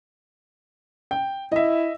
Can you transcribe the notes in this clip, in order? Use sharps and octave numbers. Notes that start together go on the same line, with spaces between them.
G5
E4 D#5 E5